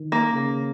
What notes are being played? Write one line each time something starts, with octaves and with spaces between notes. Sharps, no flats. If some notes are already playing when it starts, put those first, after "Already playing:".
Already playing: D#3
A#3
C#3